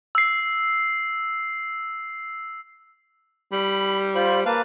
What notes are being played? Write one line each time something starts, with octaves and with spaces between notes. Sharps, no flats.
E6 C7
G3 B5
F4 C5 B5
A#3 B4 F5 A5